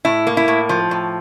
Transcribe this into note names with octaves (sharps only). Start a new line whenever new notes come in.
A2 E4
A#3
E4
A2
F3
A2